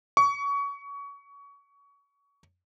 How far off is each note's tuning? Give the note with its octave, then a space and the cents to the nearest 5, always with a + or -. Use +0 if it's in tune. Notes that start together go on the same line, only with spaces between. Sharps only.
C#6 +25